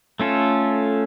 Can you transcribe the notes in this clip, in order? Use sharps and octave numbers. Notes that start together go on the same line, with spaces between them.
A3 C#4 F4 A4